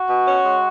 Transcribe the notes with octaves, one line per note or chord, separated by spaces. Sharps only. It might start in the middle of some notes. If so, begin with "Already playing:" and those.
Already playing: F#4
B2
C#4
G#3